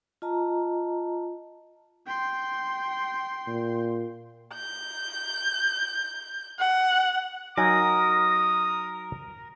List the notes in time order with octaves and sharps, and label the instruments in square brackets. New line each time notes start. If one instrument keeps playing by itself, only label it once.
[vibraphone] F4 D#5 A5 A#5
[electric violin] G5 C6
[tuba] A#2
[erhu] G6
F#5
[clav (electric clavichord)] F#3 D#4 G#5 [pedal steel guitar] A#4 [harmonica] D#6